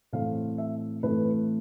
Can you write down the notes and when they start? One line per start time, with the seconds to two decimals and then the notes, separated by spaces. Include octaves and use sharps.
0.13 A2 E3 A3 C4 F5
0.58 E5
1.03 A2 E3 A3 C4 B4